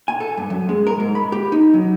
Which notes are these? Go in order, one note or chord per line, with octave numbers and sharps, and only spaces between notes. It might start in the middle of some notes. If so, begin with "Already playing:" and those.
G#5
A4
G2
F#2
G#3
A#4
G#2
B5
G4
D#4
F#3